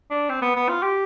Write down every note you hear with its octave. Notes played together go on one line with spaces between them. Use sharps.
D4
C4
B3
B3
F4
G4